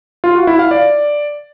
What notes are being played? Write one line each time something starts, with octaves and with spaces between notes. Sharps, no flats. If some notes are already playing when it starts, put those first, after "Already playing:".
F4
F#4
E4
F5
D5